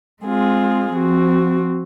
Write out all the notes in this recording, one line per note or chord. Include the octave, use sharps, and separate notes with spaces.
G#3 C4 F4 G#4
F3 C4 F#4